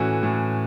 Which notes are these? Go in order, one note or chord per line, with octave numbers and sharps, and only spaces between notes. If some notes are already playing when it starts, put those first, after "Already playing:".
Already playing: A2 E3 A3 C#4 F#4
A2